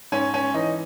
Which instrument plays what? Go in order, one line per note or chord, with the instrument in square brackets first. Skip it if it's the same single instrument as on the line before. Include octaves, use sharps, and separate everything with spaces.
[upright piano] G#2 C#4
C#4
E3 D#4